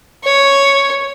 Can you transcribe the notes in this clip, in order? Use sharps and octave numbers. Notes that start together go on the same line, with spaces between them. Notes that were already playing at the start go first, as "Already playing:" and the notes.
C#5